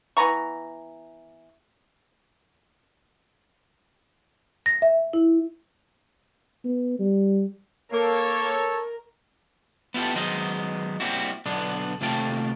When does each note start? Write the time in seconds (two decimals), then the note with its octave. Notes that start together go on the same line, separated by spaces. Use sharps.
0.17 E3 B3 A#5 C#6
4.66 A#6
4.82 E5
5.13 E4
6.65 B3
6.99 G3
7.92 A#3 A4 A#4 C#5
9.94 B3 E4 F4 G4 A4
10.15 D#3 F#3 G#3 B3 C5 D#5
11.00 G3 A#3 C4 E4 F#4
11.46 B1 D3 B3 D4
12.01 D#2 C3 A3 F4 A4 G5